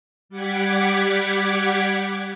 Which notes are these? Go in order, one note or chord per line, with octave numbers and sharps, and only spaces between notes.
G3 G4 F#5 D6 G#6 B6